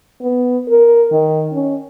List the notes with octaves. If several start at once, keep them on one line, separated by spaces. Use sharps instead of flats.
B3
A#4
D#3
C#4